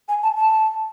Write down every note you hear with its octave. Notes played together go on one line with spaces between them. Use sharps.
G#5
A5
A5